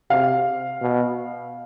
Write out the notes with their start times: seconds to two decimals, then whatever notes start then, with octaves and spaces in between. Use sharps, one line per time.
0.10 C3 F5
0.82 B2